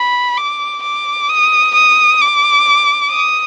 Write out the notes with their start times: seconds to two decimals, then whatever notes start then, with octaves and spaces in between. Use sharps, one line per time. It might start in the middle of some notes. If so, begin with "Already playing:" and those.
Already playing: B5
0.37 D6
0.83 D6
1.29 D#6
1.74 D#6
2.21 D6
3.11 D#6